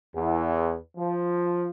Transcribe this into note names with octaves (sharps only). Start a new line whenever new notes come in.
E2
F3